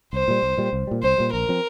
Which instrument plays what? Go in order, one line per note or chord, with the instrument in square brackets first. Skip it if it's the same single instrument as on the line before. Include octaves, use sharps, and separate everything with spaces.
[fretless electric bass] C2 [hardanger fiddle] C5
[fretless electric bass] A#2 G3
C2
A#2 G3
C2
A#2 G3
[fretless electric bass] C2 [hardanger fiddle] C5
[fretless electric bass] A#2 G3
[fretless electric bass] A#1 [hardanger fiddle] A#4
[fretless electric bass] F3 C4